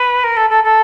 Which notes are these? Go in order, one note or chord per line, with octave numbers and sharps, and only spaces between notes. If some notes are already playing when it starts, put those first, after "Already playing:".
Already playing: B4
A#4
A4
A4
A4